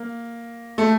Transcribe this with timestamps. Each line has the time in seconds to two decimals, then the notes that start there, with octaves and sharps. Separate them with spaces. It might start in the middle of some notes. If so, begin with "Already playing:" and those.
Already playing: A#3
0.78 A3